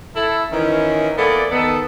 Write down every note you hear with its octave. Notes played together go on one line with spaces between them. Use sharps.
E4 A4
D#3 E3 C#4
E3 A#3 B3 A4 D5
D#3 B3 A4